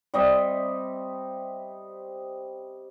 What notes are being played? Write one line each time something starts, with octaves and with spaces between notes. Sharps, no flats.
G3 C4 D#5 E5